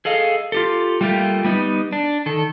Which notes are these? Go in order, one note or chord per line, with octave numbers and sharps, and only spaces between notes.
G#4 A4 D#5 F5
F4 G4 A4
G3 A3 A#3 F4 G4
G3 B3 D#4
D4
D#3 A4